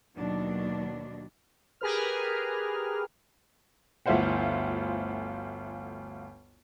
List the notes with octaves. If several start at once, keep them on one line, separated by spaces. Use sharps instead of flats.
D#2 B2 D#3 F#3 D4
G4 G#4 A#4 B4 F6
G1 D2 E4 F4 C5 F#5